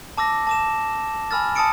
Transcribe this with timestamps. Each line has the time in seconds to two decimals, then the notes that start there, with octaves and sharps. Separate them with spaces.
0.17 A5 D6 E6 A#6
0.47 A5 D6 E7
1.31 G#5 B5 E6 F6 A6
1.55 A5 D#6 E6 A6 C#7 D7